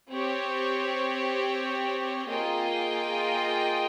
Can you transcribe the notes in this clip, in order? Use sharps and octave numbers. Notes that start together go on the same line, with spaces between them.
C4 G4 C#5
A#3 F4 G#4 D#5 G5